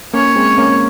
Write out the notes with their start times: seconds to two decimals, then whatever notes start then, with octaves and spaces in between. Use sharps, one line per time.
0.13 A#3 C#4 C#5
0.36 G#3 C4
0.58 A#3 C#4